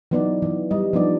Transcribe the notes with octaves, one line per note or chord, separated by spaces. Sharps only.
E3 F#3 B3 D#4 D5
E3
G3 D#5
F3 G3 B3 D4 D#4 D5